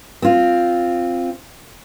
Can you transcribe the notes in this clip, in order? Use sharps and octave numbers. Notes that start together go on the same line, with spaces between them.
C4 F4